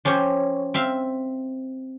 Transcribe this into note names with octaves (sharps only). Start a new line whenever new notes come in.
F3 C#4 G4 C5 C#5
C4 E5 F5